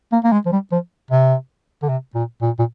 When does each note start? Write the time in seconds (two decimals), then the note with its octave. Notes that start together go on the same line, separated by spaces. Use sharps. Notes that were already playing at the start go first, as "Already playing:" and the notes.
0.12 A#3
0.24 A#3
0.32 G#3
0.46 F3
0.52 G3
0.72 F3
1.11 C3
1.83 D3
1.89 C3
2.15 A#2
2.42 A#2
2.59 A#2